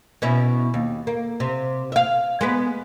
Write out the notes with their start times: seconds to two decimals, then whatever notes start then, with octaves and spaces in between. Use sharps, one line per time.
0.22 B2 C#4 E4
0.74 D#2
1.07 A#3
1.40 C3
1.92 E5 F5
2.41 G#3 B3 B4